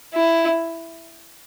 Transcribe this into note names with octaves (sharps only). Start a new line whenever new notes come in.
E4